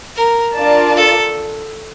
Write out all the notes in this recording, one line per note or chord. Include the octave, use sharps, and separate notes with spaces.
A#4
D4 F4 A#4 D5 A5
A4